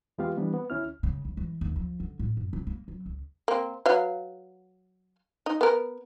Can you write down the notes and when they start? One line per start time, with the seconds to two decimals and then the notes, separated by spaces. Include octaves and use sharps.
0.18 E2 G#3 B3 F4 G4 F5
0.37 E3 G3 B3 D4
0.54 B3
0.70 D2 C#4 E4 F6
1.03 C#3
1.25 D#2
1.37 E3
1.61 D#2
1.76 F3
2.00 D3
2.19 A2
2.37 F#2
2.53 C3
2.67 A#3
2.88 F#3
3.06 C#2
3.48 A#3 C4
3.86 F#3 B4 F5
5.46 D#4
5.61 B3 A#4